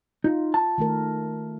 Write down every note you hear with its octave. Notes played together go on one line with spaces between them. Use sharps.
D#4 F4
A5
D#3 A3 A#4